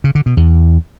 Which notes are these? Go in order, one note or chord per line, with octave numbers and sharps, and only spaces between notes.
C#3
D3
B2
E2